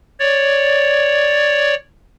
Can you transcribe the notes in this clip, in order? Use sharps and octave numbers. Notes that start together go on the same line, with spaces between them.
C#5 D5